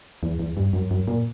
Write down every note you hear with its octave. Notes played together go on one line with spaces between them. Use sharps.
E2
E2
G2
F#2
F#2
A#2